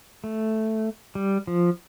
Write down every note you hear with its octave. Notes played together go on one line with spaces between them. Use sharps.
A3
G3
F3